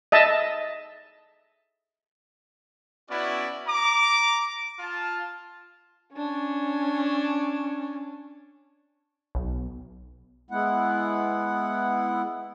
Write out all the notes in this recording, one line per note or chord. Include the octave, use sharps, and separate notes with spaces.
D#5 E5 A5
B3 C#4 E4 F#4 D5
A#5 D6
F4 A5
C#4 D4
B1
G#3 B3 E4 F#5